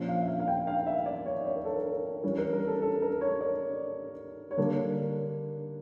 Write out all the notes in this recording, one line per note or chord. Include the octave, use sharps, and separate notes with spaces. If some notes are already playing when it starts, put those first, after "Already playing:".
Already playing: A#2 F3 C#4
F5
E5
F5
F5
G5
F5
E5
D5
C#5
C#5
A#4
A4
A#4
E3 G3 C#4 C#5
A#4
A#4
A4
A4
A#4
C#5
D5
C#5
D3 G3 A#3 D4 A#4